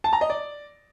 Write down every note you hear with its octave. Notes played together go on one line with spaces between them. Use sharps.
A5
A#5
D#5
D5